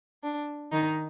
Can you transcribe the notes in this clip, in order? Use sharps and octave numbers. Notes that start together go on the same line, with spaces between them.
D4
D#3 D#4